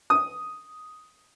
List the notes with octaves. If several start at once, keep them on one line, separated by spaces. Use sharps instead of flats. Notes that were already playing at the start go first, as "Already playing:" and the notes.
D#6